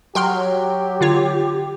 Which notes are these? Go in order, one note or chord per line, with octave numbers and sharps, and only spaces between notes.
F#3 G4 G5 C6 F6
D3 F4 C#5